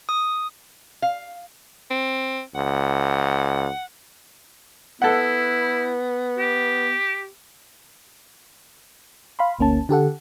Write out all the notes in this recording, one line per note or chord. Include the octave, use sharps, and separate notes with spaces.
D#6
F5
C4
C#2 F#5
B3 E4 A4 F#5
G4
F5 B5 C6
G1 D2 A#3 C#4 A5
D3 G4 A4 F#5